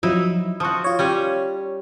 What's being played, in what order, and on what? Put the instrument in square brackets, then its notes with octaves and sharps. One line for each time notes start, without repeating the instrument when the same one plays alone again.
[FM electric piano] F3 F#3 [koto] D#4 E4
[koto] F3 F#4 [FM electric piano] C#6 D#6
[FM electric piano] F4 C#5
[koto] G3 C#4